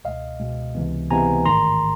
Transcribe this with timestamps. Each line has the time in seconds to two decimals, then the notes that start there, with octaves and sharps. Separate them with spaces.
0.04 C#2 B2 G#3 D#5 F5
0.39 C#2 B2 G#3
0.75 C#2 C3 E3 G#3 B3
1.10 C#2 C3 E3 G#3 B3 G#5 A#5
1.45 A1 G#2 D#3 A#5 C6